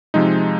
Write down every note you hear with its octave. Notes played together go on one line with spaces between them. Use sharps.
C3 F3 G#3 D#4